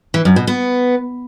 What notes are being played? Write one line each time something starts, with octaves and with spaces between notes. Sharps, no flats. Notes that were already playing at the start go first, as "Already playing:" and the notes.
E3
F#2
B2
B3